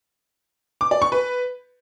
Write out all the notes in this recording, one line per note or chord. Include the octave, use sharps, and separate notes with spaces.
D6
D5
C#6
B4